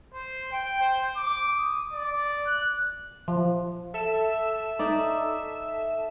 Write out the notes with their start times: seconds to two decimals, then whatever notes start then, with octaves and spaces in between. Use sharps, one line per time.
0.14 C5
0.52 G5
0.81 C5
1.16 D6
1.58 D#6
1.93 D5
2.46 F#6
3.28 F3
3.94 A4 E5 E7
4.79 D#4 D5